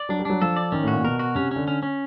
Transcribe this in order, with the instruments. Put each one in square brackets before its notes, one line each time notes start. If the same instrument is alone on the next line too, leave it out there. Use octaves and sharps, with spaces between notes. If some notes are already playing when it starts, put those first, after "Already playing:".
Already playing: [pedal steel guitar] D5
[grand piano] F#3 [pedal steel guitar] D4
[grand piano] G3
[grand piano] F#3 [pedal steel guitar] D4
[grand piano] F3 [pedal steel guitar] A4
[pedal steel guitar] D5
[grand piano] D#3 [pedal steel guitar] C#4
[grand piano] A2 [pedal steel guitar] F#4
[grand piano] A#2
[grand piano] B2 [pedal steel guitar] A#4
[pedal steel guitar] F#4
[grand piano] C3 [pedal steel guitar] C#4
[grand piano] D3 [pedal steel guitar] C#4
[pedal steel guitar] C#4
C#4